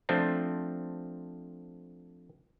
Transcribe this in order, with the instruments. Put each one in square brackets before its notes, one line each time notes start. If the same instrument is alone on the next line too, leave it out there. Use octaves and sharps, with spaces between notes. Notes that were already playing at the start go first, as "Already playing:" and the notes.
[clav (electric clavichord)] F3 A3 C4 D4